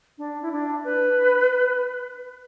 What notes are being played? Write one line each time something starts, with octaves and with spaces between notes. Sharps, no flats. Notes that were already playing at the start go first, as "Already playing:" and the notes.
D4
E4
D4
B4